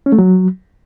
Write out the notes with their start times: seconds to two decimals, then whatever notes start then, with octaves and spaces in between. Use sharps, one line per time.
0.06 C#4
0.12 A3
0.19 F#3